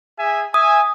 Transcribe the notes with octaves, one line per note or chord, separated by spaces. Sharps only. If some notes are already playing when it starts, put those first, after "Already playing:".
G#4 E5 G#5
E5 G#5 D#6